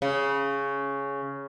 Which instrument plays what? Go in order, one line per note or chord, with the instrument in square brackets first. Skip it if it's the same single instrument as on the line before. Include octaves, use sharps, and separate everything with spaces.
[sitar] C#3